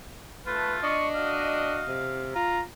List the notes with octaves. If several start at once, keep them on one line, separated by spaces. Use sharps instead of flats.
A3 F4 B4
D4 D#5 C#6
F#4 F5
C3
F4 A#5